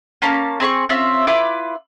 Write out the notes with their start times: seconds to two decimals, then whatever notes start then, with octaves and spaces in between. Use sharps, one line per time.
0.22 A#3 C#4 F4 A5
0.60 C4 G#4 B5 C#6
0.89 C4 C#4 F4 E5
1.27 E4 F4 B4 D6